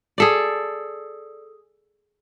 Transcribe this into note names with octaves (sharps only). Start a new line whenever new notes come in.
G#4 A4 D5